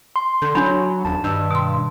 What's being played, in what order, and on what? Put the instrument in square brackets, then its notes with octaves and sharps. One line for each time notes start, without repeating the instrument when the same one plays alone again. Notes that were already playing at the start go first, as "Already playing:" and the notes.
[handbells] C6
[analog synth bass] D3 [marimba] G6
[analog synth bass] F#3 [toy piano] D4 B5
[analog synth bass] D#1 [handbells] A5
[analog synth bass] G2 [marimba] D#3 E6
[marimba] B2 C6